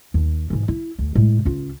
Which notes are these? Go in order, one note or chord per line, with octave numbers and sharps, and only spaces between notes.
D#2
G#2 E3
E4
D2
A2 G#3
C#2 F4